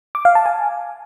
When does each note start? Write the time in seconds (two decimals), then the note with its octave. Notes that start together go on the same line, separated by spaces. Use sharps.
0.15 D6
0.25 F5
0.35 A5
0.46 G#5